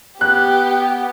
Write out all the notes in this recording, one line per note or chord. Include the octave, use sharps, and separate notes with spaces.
B3 G4 F#6